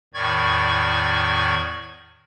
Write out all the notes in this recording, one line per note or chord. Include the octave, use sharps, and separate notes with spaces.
E2 A2 D#3 D5 C#6 G#6